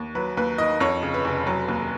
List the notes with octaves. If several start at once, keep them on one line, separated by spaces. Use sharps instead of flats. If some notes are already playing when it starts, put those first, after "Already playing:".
Already playing: D#2
F#3 B4
D#2 B4
D#3 D#5
F2 C#5
C#3
B4
F1
F#3
D#2